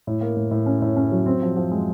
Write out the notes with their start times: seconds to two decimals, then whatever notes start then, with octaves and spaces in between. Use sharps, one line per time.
0.07 A2
0.21 A#3
0.37 A2
0.51 A2
0.66 C#4
0.82 A2
0.96 C#4
1.12 F#3
1.26 C4
1.42 F3
1.56 F3
1.71 G#3